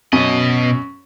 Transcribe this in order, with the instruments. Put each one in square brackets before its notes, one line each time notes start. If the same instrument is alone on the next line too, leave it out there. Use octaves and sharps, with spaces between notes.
[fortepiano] F#2 [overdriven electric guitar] B2 D#5